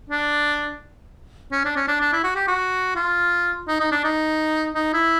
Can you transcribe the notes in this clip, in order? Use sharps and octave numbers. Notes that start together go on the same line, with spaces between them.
D4
C#4
D4
C#4
D4
D4
E4
F#4
G4
F#4
F4
D#4
D#4
D4
D#4
D#4
E4